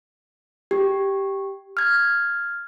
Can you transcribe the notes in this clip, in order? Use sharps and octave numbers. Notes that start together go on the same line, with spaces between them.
G4
F6 G#6